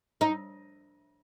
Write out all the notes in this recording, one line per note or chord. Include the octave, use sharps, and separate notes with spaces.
D#4